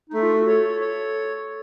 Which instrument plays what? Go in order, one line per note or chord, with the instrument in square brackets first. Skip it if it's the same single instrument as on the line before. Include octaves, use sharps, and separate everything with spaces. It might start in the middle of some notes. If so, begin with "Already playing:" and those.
[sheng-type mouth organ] A3 [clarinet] D#4
[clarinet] F4
F#4
[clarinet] A4 [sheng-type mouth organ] C#5
[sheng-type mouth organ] C#5